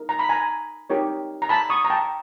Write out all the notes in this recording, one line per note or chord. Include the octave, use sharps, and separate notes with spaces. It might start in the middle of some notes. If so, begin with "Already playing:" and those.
Already playing: D#4 A#4
A#5
B5
G#5 A#5
D#4 G4 A#4 C#5
A#5
A5 B5
C#6 D#6
A#5
G5 A5